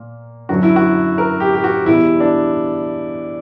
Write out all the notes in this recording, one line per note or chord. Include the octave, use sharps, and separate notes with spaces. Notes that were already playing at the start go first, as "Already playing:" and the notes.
Already playing: A#2 A#3
F#2 D3 F#3 F#4
E4
F#4
A#4
G4
G4
F#4
E2 B2 G3 E4
D4